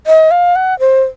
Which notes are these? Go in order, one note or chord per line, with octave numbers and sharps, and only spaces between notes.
D#5
F5
F#5
C5